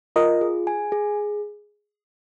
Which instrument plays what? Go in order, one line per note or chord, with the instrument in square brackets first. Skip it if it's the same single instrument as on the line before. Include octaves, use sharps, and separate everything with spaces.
[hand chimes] F4 [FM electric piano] A#4 D#5
[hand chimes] G#4
G#5
G#4